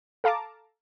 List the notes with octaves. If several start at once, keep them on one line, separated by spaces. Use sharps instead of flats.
A4 F5 A5 A#5 D6